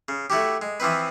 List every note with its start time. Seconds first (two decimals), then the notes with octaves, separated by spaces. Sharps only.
0.08 C#3
0.30 A3 E4 F#4 G4
0.62 G#3
0.80 E3 F3 C4 B4